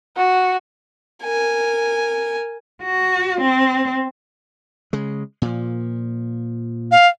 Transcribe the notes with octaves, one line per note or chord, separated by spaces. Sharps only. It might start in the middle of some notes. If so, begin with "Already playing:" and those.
F#4
A#4 G#5
F#4
C4
C#3 G#3
A#2 F3
F5